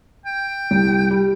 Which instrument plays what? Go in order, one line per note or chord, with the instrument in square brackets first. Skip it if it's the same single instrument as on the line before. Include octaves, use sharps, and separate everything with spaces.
[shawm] G5
[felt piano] C2
G3